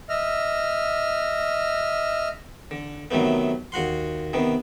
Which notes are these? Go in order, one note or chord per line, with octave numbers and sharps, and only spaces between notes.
D#5 E5 F6
D3
C3 D#3 F#3 A3 B3
D#2 F#4 F#5 C6
C3 D#3 B3